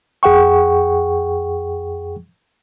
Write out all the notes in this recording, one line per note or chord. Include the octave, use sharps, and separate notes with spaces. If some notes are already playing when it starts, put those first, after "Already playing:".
F2 G#4 F#5 G5 C#6